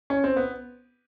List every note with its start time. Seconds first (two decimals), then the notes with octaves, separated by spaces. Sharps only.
0.10 C#4
0.24 C4
0.36 B3